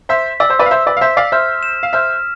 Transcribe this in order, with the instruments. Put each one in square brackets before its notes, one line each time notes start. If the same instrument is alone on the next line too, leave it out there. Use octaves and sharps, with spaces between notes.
[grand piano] C5 E5 [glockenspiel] B6
[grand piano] D5 [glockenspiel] E6
[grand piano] C5
B4 D5
F5
[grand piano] C5 E5 [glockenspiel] E6
[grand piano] B4 D5
F5
[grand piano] C5 E5 [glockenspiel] B6
[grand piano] D5 F5
[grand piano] C5 E5 [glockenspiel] F6
[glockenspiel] E7
[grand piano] F5
[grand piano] C5 E5 [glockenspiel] F6